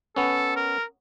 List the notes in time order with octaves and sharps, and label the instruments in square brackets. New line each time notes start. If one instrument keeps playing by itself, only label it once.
[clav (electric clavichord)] B3 C#4 [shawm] A4
[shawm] A#4